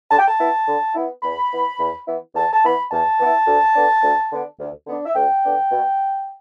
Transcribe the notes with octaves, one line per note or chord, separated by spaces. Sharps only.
D3 A5
G5
A5
B3 E4
D3
B3 E4
E2 B5
E3 B3 E4
E2
E3 B3 E4
E2 A5
A5
E3 B3 E4 B5
E2 A5
E3 B3 E4
D2
D3 B3 D4
D2
D3 B3 D4
D2
D3 B3 D4
E5
D2 G5
D3 B3 D4
B2